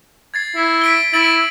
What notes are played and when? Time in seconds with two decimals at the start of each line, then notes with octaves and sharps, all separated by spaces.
0.34 G#6 A6 C7
0.55 E4
0.81 B6 D7 G7
1.13 E4 A6 D7 F#7